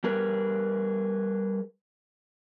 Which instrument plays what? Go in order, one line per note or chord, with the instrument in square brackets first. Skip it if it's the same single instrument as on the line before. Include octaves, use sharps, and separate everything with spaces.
[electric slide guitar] G3 G4 G#4 A#4 B4